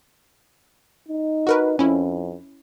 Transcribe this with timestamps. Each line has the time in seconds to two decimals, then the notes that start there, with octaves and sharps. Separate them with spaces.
1.08 D#4
1.47 F#4 A#4 B4
1.79 F2 C#4 E4